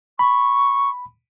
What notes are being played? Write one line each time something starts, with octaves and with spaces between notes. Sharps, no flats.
B5 C#6